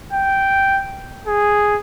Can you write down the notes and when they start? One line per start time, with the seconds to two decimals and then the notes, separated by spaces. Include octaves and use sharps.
0.13 G5
1.27 G#4